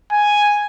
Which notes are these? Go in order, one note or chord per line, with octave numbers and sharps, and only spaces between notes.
G#5